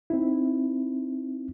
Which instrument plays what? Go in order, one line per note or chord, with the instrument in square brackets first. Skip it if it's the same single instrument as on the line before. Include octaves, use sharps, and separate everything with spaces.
[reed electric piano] C4 D#4 E4